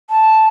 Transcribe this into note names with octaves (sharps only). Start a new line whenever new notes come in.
A5